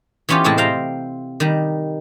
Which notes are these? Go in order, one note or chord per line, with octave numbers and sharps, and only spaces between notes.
E3 B3 C#4 F4 G4
A2 C3 G#3 C4 E4 A5
C5 F5 G5 A#5
D#3 G3